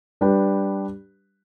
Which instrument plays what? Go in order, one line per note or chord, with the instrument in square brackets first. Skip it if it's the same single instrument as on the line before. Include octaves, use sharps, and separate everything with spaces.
[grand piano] G3 D4 G4 B4